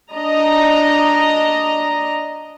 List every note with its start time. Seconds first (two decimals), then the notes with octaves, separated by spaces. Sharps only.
0.13 D4 D#5 A#5